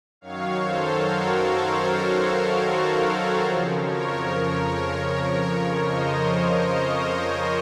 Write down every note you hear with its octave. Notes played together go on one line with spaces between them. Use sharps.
F#2 D#3 F#3 C#5 F5
A4 C5
F#4 A#4
F#4 A#4
F#4 A#4
F2 C#3 F3
A#4 C#5
C5 D#5